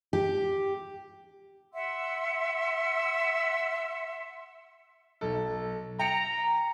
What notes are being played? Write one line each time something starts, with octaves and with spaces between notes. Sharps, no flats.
G4
E5 F#5 C6 E6
B1 A4
G5 A#5 C#7 F7